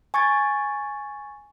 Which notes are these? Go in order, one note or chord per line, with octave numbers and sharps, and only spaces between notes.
G#5 C#6 G#6 A6